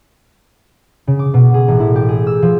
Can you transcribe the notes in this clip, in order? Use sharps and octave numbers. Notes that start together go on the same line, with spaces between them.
C#3
D6
B2
G#4
A1
E4
G4
G#4
E6
F3